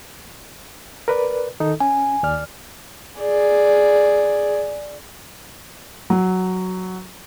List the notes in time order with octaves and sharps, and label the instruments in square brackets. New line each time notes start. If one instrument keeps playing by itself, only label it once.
[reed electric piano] A#4 B4 D5
D#3 D#4 A4
[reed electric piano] C#4 [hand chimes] G#5
[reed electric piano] D#2 D5 F6
[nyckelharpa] G#4 D5
[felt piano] F#3